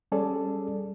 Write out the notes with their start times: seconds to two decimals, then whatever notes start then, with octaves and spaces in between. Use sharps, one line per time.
0.12 G3 C#4 G#4 A4 D5